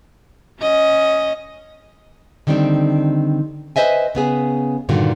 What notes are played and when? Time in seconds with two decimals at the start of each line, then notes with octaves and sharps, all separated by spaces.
0.61 C#4 D#5
2.47 D3 D#3 G3 C4 D4
3.76 B4 C5 D#5 E5 G#5
4.15 C#3 B3 G#4
4.89 G2 A#2 D3 D#3 F#4